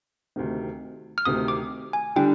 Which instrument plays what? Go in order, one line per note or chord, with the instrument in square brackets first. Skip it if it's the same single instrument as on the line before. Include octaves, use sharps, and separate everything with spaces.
[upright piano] D2 C3 D#3
[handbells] F6
[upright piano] D2 C3 D#3 [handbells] D#6
[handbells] D6
G#5
[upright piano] D3 G3 D4 [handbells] G5